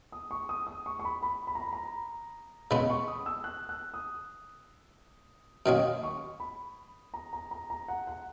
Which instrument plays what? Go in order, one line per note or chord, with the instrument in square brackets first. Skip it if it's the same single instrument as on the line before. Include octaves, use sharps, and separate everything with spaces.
[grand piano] D#6
C#6
D#6
D#6
C#6
C#6
B5
B5
B5
A#5
B5
A#5
[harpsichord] C#3 G#3 B3 [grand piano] B5
[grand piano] C#6
D#6
E6
F#6
F#6
D#6
[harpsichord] F#2 D#3 A#3 C#4 [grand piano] D#6
[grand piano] C#6
B5
A#5
A#5
A#5
A#5
F#5
F#5